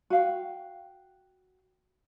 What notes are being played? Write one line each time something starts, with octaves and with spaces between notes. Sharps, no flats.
F#4 F5 G5